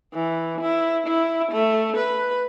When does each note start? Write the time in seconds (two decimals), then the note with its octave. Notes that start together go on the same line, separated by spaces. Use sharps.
0.14 E3
0.61 E4
1.07 E4
1.52 A3
1.97 B4